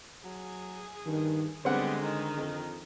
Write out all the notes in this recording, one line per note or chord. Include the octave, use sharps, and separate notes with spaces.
F#3 G#4
G2 D#3
D3 G3 G#3 B3 C4 F#5
D#3 D#4
F2